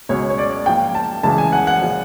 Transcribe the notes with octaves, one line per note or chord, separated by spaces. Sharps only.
C#2 B2 G#3 C#5
C#5
D5
G#2 F3 A#3 G5
A5
C#2 C#3 E3 G#3 A5
G#5
F#5
F#5
A#2 F3 G#3